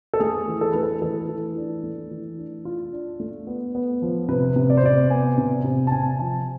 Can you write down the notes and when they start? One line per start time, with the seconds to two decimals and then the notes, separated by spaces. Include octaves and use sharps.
0.14 A4
0.20 A3 G#4
0.48 E3
0.61 A4
0.72 A3 B4
0.83 A4
1.02 E3 A4
1.28 E3
1.57 D4
1.83 A3
2.11 E3
2.38 D4
2.65 F4
2.93 D4
3.20 A3
3.47 B3
3.75 B3
4.02 F3
4.28 C3 B4
4.56 C3
4.70 D5
4.77 C5
4.83 C3 D5
5.10 B3 G#5
5.38 C3
5.64 C3
5.87 A5
5.92 C3 G#5
6.19 F3 A5